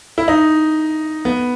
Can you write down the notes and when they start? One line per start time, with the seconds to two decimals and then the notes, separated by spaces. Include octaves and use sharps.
0.18 E4
0.28 D#4
1.25 B3